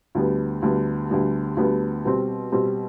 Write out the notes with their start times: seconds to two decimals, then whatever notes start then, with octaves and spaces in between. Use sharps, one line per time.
0.15 D2 D3 G3 B3
0.62 D2 D3 G3 B3
1.10 D2 D3 G3 B3
1.57 D2 D3 G3 B3
2.05 B2 G3 C4
2.52 B2 G3 C4